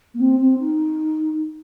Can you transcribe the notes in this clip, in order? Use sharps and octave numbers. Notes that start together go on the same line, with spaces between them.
A#3
C4
C4
D#4